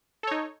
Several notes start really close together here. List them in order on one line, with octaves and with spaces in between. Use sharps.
A4 C#5 D#4